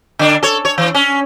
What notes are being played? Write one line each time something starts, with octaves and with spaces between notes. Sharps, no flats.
D3 D4
A4 C#5
C#5
E3
C#4